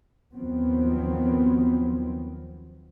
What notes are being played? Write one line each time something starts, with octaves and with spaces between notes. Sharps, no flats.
D#2 D#3 F3 F#3 B3 C4